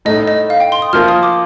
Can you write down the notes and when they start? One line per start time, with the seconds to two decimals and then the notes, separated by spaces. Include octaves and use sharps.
0.05 A2 A3 D#4 D#5
0.27 D#5
0.50 F5
0.60 G5
0.72 C6
0.82 D#6
0.93 F3 A#3 F4 F6
1.08 D#6
1.23 D6